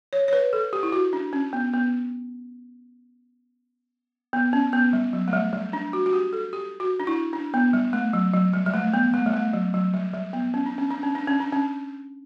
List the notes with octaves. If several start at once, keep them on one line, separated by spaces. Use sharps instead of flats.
C#5
C#5
B4
A4
G4
E4
F#4
D4
C#4
B3
B3
B3
C#4
B3
G3
F#3
A3
G3
G3
D4
F#4
F#4
G4
A4
G4
F#4
D4
E4
D4
B3
G3
A3
F#3
F#3
G3
G3
A3
B3
A3
G3
A3
F#3
F#3
G3
G3
B3
C#4
D4
C#4
D4
C#4
D4
C#4
D4
C#4